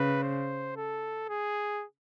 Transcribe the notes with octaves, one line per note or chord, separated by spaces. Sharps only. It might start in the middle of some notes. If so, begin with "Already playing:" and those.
Already playing: C#3 B4
C5
A4
G#4